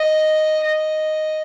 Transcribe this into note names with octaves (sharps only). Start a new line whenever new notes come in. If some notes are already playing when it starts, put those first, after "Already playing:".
Already playing: D#5
D#5